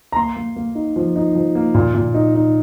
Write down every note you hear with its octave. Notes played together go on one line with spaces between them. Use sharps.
A#5
A#3 C6
A#3
A#3
D#4
F3
D#4
F3
A#3
A#2
A#2
D#4
D#4